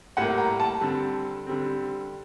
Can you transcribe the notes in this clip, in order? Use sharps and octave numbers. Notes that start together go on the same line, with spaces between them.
A2 G3 A#3 F#5
A#5
A5
D3 G3 C4
D3 G3 C4